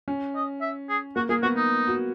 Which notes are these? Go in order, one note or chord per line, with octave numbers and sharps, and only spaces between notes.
C#4
D#5
E5
G#4
A#3 F#4
A#3 G#4
B3 F#4
D#4
F#4